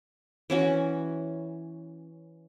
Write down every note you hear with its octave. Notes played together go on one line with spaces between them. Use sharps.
E3 C#4 F#4